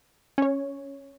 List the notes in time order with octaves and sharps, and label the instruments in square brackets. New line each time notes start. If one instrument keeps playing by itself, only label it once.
[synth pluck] C#4 C#5